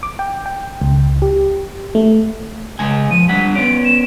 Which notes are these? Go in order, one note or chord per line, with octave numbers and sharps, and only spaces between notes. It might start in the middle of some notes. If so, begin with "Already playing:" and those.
D6
G5
G5
C#2
G4
A3
C#3 G#3 G#5
F3 D#7
D3 G3 F#5 B6
B3 C#4 D7
E7